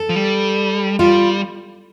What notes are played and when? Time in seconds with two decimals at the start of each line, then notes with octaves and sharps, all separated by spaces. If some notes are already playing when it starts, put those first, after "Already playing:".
Already playing: A4
0.09 F3
0.15 G3
0.99 G3 F4